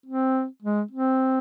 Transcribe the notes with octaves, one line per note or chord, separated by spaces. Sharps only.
C4
G#3
C4